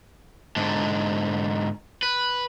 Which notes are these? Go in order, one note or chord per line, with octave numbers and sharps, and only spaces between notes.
G#2 D3
B4